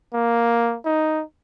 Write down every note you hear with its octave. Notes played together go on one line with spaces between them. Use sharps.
A#3
D#4